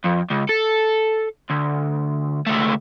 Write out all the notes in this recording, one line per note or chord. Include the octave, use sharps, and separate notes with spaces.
F2
C#2
A4
D2
C#2 A3